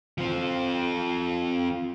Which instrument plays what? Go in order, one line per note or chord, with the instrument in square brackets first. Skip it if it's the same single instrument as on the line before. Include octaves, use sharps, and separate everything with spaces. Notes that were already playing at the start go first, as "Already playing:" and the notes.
[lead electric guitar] F3 C4